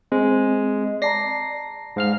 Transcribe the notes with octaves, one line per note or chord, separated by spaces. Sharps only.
G#3 C4
D5 A5 A#5 A#6 C7
G#2 F5 F6